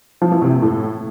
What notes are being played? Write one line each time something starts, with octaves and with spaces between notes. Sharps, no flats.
F3
E3
C3
A#2
A2